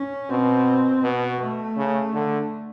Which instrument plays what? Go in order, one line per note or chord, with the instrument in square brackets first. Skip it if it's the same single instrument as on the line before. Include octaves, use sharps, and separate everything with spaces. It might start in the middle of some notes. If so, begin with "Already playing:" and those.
Already playing: [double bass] C#4
[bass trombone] B2 [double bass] C4
[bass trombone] B2 [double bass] B3
[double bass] A3
[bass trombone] C#3
D3